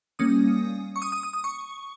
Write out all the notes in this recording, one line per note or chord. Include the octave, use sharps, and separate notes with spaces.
G3 A#3 C#4 D#6
C#6
D#6
D#6
D#6
D#6
C#6